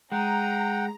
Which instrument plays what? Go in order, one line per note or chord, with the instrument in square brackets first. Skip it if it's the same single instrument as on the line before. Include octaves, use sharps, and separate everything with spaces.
[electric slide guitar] G#3 [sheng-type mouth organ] F#5 G5 [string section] A#5